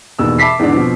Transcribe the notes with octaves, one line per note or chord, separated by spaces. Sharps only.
E1 D#2 B2 E6
E5 A5 B5 D6 B6 C7
E2 G#2 D3 D4
B2 F3 C4